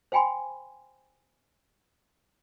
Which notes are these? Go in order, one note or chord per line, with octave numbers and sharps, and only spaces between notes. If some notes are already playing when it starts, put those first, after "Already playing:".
C5 F5 G5 G#5 B5 C6